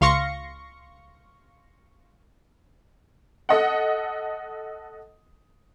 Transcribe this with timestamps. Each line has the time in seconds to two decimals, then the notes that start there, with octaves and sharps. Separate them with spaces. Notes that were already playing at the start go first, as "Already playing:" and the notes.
0.01 C#2 F5 C6 C#6 A#6 C#7
3.49 A4 D#5 F#5